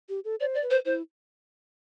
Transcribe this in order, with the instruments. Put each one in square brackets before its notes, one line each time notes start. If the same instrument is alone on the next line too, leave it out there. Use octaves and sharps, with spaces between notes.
[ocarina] G4
A4
[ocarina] C5 [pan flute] D5
[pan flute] D5
[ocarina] B4
[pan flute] C5
[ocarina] E4 [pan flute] C5